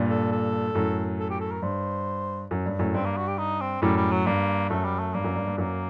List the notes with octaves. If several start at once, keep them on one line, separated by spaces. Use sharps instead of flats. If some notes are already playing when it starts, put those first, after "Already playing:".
Already playing: G2 A#2
A4
A4
F#2 A2
A4
G4
A4
A#4
G2 C5
F#2
G2
F#2 A2
G2 C4
A#3
F#4
G4
D#4
C4
F#2 A2 G3
G3
F#3
G2 A#3
F#2 A3
G3
A3
G2 A#3
F#2
G2
G2
F#2 A#3